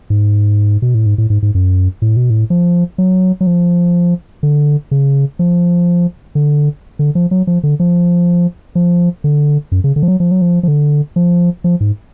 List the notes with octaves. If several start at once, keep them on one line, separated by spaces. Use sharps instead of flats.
G#2
B2
A2
G#2
A2
G#2
G#2
F#2
A2
B2
A2
F3
F#3
F#3
F3
D3
C#3
F3
D3
D3
F3
F#3
F3
D3
F3
F3
D3
F#2
C#3
D3
F3
F#3
F3
F#3
F3
F3
D3
F3
F3
G#2